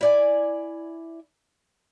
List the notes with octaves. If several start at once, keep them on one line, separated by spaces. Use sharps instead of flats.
E4 D5 G#5